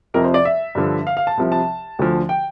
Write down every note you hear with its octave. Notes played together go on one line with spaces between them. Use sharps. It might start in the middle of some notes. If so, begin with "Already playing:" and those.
F2 C3 F3 A#4
C5
D5
E5
G2 D3 F3
F5
F5
A5
C2 C3 F3
A5
D2 D3 F3
G5